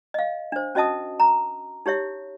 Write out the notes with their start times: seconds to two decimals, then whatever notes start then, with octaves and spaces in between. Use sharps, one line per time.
0.14 D#5 F5
0.52 D4 C5
0.75 C#4 F#4 D#5 E5 A5 D#6
1.20 A#5
1.86 D#4 G4 C#5 E5